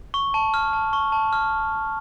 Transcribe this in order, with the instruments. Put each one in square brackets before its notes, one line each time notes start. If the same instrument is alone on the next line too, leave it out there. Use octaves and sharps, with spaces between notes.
[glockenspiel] C#6
A5
F6
A5
C#6
A5
F6